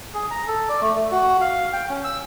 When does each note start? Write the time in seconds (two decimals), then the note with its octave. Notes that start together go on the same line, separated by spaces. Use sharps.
0.14 G#4
0.31 A#5
0.48 A4
0.69 D5
0.81 A3
0.95 A3
1.11 F#4
1.41 F5
1.73 G5
1.89 C#4
2.04 E6